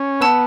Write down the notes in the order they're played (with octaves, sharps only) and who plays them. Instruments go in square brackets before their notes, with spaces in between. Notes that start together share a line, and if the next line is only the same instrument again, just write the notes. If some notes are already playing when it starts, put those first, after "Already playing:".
Already playing: [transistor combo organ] C#4
[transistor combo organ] B3 [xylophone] F#5 A5 E6